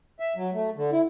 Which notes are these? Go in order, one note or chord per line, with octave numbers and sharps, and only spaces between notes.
E5
F#3
A3
D3
E4